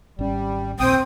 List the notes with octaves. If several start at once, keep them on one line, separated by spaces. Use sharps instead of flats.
G#1 G3 C#4
A#1 D#2 A#2 C4 G5 D#6